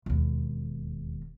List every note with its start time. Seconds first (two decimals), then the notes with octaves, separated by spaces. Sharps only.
0.06 E1 D#2